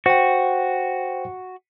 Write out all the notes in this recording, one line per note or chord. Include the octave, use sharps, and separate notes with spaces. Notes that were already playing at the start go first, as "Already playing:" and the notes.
F#4 C5 G5